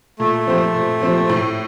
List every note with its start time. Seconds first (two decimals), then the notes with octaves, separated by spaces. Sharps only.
0.19 A#2 A3
0.47 F3 C4 G4 C5
0.74 A#2
1.02 F3 C4 G4 C5
1.30 A2